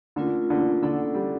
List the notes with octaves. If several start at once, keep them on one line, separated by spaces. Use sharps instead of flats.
D3 A3 C#4 F4 A#4
D3
D3 C#4 E4 A4 D5 F#5
G3